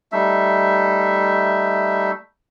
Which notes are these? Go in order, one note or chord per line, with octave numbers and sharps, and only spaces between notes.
G3 A3 D#4 E5